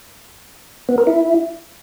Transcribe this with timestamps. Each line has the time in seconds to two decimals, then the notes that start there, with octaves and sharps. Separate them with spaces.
0.89 B3
0.98 A#4
1.07 E4